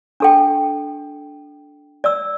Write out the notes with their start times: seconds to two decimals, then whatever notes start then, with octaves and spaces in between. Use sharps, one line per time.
0.20 D4 A4 G5
2.04 D5 E6